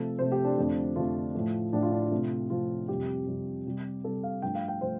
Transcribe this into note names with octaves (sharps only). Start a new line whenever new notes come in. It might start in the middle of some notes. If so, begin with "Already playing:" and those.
Already playing: C3 F3 A3 A4
C3 F3 A3 C5
G4
D4
F2 D3 F3 A3
F2 D3 F3 A3 F4
A2 F3 A3
A2 F3 A3 D4
F4
D4
F4
C3 F3 A3
C3 F3 A3 F4
F2 C3 G3 G4
F2 C3 G3
C3 G3
C3 G3 A4
F5
G2 F3 A3 G5
F5
G5
F3 A3 C5